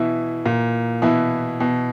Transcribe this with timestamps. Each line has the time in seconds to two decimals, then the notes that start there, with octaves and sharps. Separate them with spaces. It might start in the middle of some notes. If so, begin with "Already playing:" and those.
Already playing: B2 E3 E4
0.46 A#2
1.02 B2 E3 E4
1.60 B2